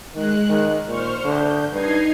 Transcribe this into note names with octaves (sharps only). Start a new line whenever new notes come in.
D#3 G#3 F#6
D#3
A#2 C5 C#6 F6
D3 G6
G2 D#4 G#6 C7